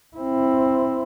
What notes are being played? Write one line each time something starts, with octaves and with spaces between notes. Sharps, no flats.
C4 E4